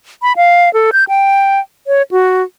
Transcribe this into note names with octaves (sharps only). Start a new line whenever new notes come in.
B5
F5
A4
G6
G5
C#5
F#4